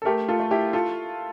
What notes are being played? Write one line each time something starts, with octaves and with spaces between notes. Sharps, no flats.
A4
A3 G4 A#4
F4 A4
A3
E4 G4
F4 A4